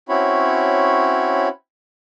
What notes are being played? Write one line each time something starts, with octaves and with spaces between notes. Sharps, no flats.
C4 C#4 E4 F#4 C#5 B5